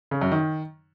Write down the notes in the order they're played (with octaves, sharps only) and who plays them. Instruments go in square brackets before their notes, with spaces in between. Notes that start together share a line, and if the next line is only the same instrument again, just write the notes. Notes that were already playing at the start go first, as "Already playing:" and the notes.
[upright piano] C#3
F#2
D#3